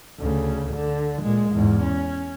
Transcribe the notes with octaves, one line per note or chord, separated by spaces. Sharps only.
D2 C#3
D3
A#2 G#3
E2 G#2
C#4